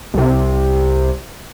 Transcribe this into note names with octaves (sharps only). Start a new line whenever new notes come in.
C2 C3